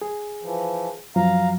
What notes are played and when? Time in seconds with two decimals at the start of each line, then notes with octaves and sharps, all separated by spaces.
0.02 G#4
0.43 E3 F3
1.16 F#2 F3 F#3 F5 A#5